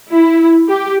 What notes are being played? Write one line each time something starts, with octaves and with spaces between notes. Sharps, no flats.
E4
G4